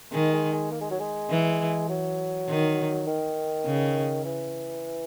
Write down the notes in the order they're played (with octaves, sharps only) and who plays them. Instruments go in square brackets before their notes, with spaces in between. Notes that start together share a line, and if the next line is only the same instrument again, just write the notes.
[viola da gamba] D#3 [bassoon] G#3
[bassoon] G#3
G#3
A#3
G#3
F#3
G#3
[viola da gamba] E3
[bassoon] F#3
[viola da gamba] D#3
[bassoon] D#3
[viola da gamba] C#3
[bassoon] E3